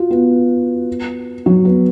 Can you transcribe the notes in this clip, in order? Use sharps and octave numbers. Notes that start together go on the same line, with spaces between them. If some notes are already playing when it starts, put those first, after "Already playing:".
Already playing: F4 F#4
B3
F#3
B3